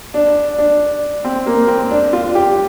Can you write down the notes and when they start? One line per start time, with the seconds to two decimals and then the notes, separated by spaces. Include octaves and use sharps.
0.14 D4
0.58 D4
1.25 C4
1.46 A#3
1.68 C4
1.91 D4
2.13 F4
2.35 G4